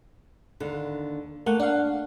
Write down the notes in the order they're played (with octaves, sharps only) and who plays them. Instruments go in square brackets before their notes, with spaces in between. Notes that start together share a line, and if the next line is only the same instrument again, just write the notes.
[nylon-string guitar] D#2 D3
[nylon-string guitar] A3 [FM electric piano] A#3 F#5
[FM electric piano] D4 F5 [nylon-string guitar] F#5